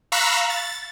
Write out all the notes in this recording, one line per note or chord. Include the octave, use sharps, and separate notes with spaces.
F5 A#5 B5 C#6 E6 F#6
A6